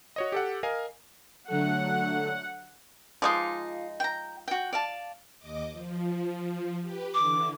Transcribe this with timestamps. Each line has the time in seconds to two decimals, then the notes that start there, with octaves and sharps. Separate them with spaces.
0.16 F#4 C#5 D#5
0.32 G4 A4 F#5
0.63 A#4 D#5 F5 G#5
1.48 D3 F#3 A3 F#5
3.22 F3 G#3 D#4 F4 C#5 D6
4.00 G5 A#5
4.48 F#4 G5
4.73 D5 F5 A5
5.38 D#2 D#5 D6
5.71 F3
6.81 G4 B4
7.14 D3 E3 D6